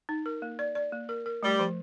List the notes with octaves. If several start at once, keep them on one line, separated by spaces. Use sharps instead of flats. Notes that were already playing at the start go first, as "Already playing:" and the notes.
D#4
A#4
A#3
D5
D5
A#3
A#4
A#4
G3 A3
F3